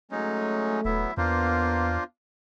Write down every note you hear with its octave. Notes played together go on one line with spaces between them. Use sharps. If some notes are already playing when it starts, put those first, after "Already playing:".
F#3 G#3 A3 C#4 D#4
D#1 F#3 B3 E4 E5
E2 A#3 B3 D4 F4 A#4 C5